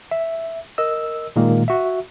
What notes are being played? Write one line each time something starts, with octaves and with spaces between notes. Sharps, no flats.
E5
A#4 D#5 E6
A#2 D#3 G#3 A#3
F#4 E5